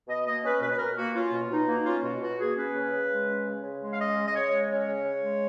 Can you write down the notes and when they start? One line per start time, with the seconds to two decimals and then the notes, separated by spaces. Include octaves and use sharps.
0.08 B2 D#5
0.26 A#3 D#5
0.44 C#4 B4
0.61 B2 B4
0.72 B4
0.79 B2 A#4
0.97 A#3 F#4
1.15 C#4 F4
1.32 B2
1.51 B2 D#4
1.67 A#3
1.85 C#4 F4
2.04 B2 F#4
2.21 B2 F#4
2.39 A#3 G#4
2.57 C#4 B4
2.75 C#3
2.93 C#3
3.11 G#3
3.28 C#4
3.45 C#3
3.63 C#3
3.81 G#3
3.93 F5
3.98 C#4 D#5
4.16 C#3
4.27 D#5
4.35 C#3 C#5
4.51 G#3
4.70 C#4 C#5
4.88 C#3
5.05 C#3
5.22 G#3